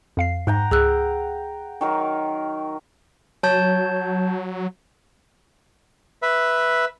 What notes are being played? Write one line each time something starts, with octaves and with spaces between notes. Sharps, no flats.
F2 F5 C7
G#2 F#5 G5 A#5
C#2 G#4 E6 F#6
D#3 F#3 A#4
F#3 C#5 A5 G6
B4 E5